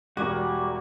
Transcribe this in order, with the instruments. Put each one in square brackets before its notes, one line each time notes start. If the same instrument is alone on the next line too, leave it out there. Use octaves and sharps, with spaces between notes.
[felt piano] E1 E2 A#4 [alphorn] G3 [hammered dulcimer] A#3 [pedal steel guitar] F#4 C#6